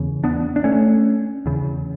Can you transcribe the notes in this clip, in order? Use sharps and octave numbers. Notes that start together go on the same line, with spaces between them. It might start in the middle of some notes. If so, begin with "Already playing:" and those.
Already playing: E2 C#3
B3 D4
D4
A3 C#4
E2 C#3